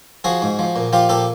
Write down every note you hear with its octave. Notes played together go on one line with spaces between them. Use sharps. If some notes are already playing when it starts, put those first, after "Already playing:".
F3 F#4 G#4
G#2
F3
A#2
F3 F4 G4
A#2 G4 A4